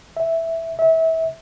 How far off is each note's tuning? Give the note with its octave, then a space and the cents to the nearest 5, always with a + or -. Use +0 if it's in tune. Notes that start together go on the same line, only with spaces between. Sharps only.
E5 -5
E5 -30